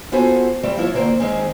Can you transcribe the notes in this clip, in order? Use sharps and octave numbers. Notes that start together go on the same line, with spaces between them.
B3 F4 F#4 A4 C5 G#5
G3 A3 C4
F3 E4 F4 C#5
D2 A#3 C4 A#4 C5
D#3 G#3 C4 C#4